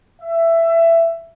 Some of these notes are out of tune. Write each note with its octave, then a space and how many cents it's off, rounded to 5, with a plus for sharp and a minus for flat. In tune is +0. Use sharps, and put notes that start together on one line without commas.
E5 +15